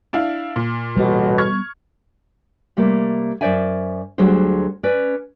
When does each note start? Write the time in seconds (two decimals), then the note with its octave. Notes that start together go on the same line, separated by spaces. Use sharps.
0.13 D4 E4 F5
0.56 A#2
0.97 A1 E2 B2 G3 G#3 B3
1.38 C#6 F6 G#6
2.77 C3 G3 A3 A#3
3.41 F#2 F#3 C5 D5 E5 G#5
4.18 D2 D3 F#3 G3 G#4 C5
4.83 C#4 B4 D5